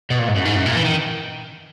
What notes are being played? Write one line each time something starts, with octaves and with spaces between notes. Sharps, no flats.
B2
A#2
G#2
F#2
G#2
F#2
A#2
E3
D#3